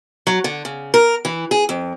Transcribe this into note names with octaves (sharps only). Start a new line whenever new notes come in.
F#3
D3
C#3
A#4
E3
G#4
F2